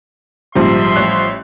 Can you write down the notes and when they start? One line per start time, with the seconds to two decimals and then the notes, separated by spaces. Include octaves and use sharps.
0.55 A#1 G#2 C#3 F3 G3 E5 C6
0.96 A1 C#5 F#6